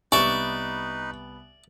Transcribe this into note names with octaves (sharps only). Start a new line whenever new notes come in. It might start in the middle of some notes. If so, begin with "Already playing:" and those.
C2 G3 B3 D#4 B4 D5 E5 C#6